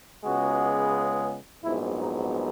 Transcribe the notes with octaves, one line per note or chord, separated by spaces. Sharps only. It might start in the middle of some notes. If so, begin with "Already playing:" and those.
C#2 C#3 G#3 B3 F#4
A#1 G#2 F#3 B3 E4
D#4